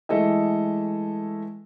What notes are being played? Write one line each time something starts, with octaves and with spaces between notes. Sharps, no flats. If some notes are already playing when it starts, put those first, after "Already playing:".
E3 G#3 A3 A4 D#5 E5